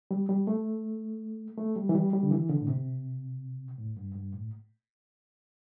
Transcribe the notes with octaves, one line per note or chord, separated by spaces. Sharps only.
G3
G3
A3
A3
G3
E3
G3
G3
D3
E3
D3
A2
C3
A2
G2
G2
A2